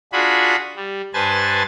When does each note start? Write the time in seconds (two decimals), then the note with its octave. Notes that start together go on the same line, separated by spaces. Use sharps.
0.13 D4 F4 F#4 G#4 B5
0.76 G3
1.13 G2 B4 C5 G#5 A5 A6